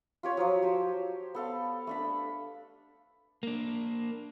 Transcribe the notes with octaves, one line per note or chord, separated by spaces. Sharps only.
F4 G4 C#5
F3 F#3 C#5
G4 C5
B3 A4 F5
A3 D4 B5
A#3 D4